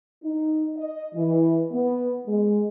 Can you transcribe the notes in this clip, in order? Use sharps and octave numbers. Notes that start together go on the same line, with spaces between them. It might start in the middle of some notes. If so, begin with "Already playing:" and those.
D#4
D#5
E3
B3
G#3